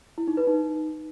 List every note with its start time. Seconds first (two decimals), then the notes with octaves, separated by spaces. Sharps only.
0.18 E4
0.28 D#4
0.37 B4
0.47 D#4